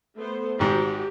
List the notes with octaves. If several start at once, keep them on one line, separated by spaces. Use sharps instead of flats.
A3 B3 C5
G#1 G#2 F#4 G4